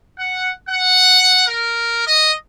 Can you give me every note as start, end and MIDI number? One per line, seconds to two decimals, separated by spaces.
0.18 0.50 78
0.68 1.46 78
1.46 2.04 70
2.07 2.31 75